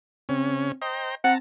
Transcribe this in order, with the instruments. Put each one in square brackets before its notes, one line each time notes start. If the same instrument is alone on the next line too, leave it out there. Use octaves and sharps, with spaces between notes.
[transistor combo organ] C#3 C#4 [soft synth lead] C4
[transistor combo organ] C5 G5 A#5 [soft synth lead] D#5
[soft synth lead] C4 [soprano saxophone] F#5 [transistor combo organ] A5 A#5